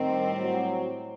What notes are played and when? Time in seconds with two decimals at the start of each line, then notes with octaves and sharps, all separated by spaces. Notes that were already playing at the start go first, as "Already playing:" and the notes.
Already playing: A2 D#3 G3 C4
0.39 F#3